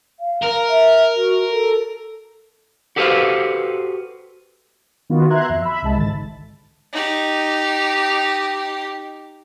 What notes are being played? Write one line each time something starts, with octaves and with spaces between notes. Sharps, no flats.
F5
A#4
E5
F#4
A4
F#4 G4 A4 B4 C5 F5
D#3 B3 F4 F#4
E5 A#5 C6 F#6 G#6
F2
E5 B5
C2 G#3 A5
G#1 D3 A6
D#4 G4